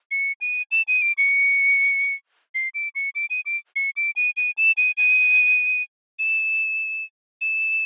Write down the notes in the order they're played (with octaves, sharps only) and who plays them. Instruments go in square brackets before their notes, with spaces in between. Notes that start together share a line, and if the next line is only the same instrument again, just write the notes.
[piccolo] C#7
D#7
E7
D#7
D7
C#7
C7
D7
C#7
D7
D#7
D7
C#7
D7
D#7
D#7
E7
D#7
D#7
E7
E7